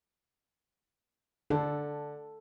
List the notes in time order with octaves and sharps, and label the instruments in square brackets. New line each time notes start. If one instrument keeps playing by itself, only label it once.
[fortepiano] D3 [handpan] A4